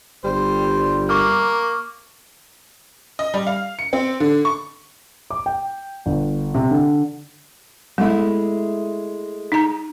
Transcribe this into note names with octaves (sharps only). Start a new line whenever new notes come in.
G1 G3 C5
A#3 C#6 D6 F6
D#5
G3
F5
C#7
C4
D3
C#6
D6
G5
G1
C3
D3
G#3 A3 B3 E4
D#4 A#5